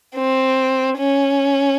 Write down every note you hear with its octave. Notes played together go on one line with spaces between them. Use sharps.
C4
C#4